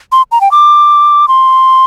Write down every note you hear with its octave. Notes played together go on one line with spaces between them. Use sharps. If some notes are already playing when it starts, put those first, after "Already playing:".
C6
A#5
G5
D6
C6